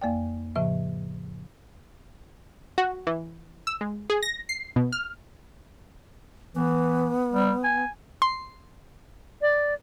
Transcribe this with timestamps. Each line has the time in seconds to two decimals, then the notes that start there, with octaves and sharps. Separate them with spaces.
0.02 F2 A#3 D5 G5
0.56 A2 C#3 F3 E5
2.78 F#4
3.07 E3
3.67 E6
3.81 G#3
4.10 G#4
4.23 A#6
4.49 C7
4.76 B2
4.92 F6
6.55 E3 B3
7.32 G3
7.64 G#5
8.22 C6
9.41 D5